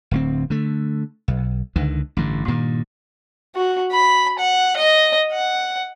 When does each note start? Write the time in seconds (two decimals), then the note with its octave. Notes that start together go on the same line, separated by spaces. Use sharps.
0.11 D1 D2 C4
0.50 D3 A3
1.28 B1
1.76 C#2 D3 D#3
2.17 A1 G2 D3
2.48 G2 A#2 D#3
3.55 F#4
3.92 B5
4.39 F#5
4.77 D#5
5.32 F#5